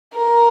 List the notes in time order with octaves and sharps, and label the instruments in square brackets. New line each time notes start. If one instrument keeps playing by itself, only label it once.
[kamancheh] A#4